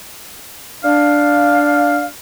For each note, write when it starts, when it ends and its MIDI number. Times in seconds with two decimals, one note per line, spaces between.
0.84 2.06 62
0.84 2.06 77